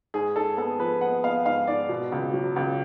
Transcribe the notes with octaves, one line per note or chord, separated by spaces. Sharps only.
G#2 G#4
G#2 A4
B3 A4
F3 B4
B3 F#5
B3 F5
G#2 F5
G#2 D5
B2
C#2
F#3
C#2